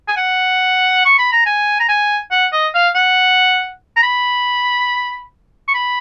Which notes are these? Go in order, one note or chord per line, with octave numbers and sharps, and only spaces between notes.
G#5
F#5
C#6
B5
A#5
G#5
A#5
G#5
F#5
D#5
F5
F#5
A#5
B5
C#6
B5